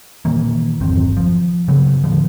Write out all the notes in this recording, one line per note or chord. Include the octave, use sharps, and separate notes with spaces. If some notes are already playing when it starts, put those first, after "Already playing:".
A#2 D#3 E3 A#3
G1 E2 F#3 C4
F3
C#3 F#3 B3
A2 D3 F3